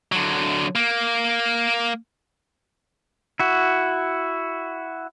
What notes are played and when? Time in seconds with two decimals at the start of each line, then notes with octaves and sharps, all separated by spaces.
0.12 D3 F#3
0.75 A#3
3.40 E4 F#4